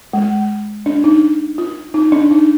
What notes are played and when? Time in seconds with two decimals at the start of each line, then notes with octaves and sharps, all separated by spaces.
0.13 G#3
0.86 D4
1.04 D#4
1.58 F4
1.94 D#4
2.12 D4
2.31 D#4